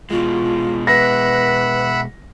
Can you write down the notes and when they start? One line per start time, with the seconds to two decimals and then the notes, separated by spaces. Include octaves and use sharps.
0.10 B2 G#3 F4
0.87 B4 E5 F#5 B5 A#6